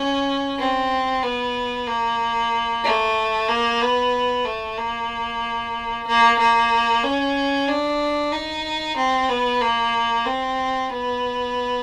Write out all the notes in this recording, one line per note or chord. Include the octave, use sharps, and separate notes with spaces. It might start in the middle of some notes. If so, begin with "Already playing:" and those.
Already playing: C#4
C4
B3
A#3
A3
A#3
B3
A3
A#3
A#3
A#3
C#4
D4
D#4
C4
B3
A#3
C4
B3